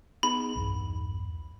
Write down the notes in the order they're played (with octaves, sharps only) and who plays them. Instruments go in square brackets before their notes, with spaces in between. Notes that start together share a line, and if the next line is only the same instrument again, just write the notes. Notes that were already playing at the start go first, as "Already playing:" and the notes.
[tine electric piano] B3 D#4 G#4 [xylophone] B5
[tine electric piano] B1 E2 G2